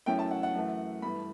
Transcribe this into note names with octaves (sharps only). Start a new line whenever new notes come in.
F#2 E3 A3 C#4 E4 G5
A5
F#5
F#5
F#2 E3 A3
G2 E3 A3 B5